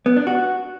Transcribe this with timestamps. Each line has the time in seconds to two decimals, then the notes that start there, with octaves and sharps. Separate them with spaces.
0.06 B3
0.16 D4
0.27 F#4